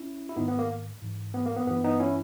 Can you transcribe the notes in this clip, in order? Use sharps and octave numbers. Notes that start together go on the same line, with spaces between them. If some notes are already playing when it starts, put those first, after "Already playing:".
Already playing: C#4 E4
E4
G#2 D#3 B3 D#4
B3
A#3
G#2 E3
B3
A#3
B3
G2 E3 B3
B3 D#4
C#4 E4